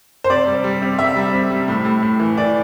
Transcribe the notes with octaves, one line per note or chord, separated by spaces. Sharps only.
C5
C3 D5
G3
G3
C3
G3 E5
G3
C3
G3
A2
A2
A2
E3
E3 D5